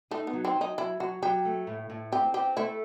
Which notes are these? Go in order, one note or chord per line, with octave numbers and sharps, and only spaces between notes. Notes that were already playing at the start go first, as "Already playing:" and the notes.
A3 D#4
B3
F#3
C4
F#3
D#4
F#3 E4
F#3 F#4
F#3 G4
A3
A2
A2
C4 G4
C4 G4
A3 E4